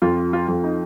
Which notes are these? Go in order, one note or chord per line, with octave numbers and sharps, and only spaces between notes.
F2 F4
F4
F2
D#4